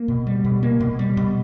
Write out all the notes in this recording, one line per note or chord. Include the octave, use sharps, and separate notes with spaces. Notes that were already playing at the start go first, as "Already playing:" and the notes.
Already playing: A#3
B2
G3
B2
A#3
B2
G3
B2